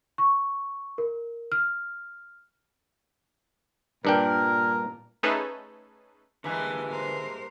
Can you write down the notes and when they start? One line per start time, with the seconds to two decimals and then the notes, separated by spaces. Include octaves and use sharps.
0.18 C#6
0.98 A#4
1.52 F6
4.05 G2 A#2 D4 A#4 G5
5.23 A3 C#4 D#4 G#4 A4 B4
6.44 G2 D3 E3 G#3 A#3 B4 F#5 G#5
6.91 A#4 C5